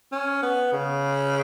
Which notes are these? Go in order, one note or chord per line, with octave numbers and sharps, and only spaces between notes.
C#4
B3
C#3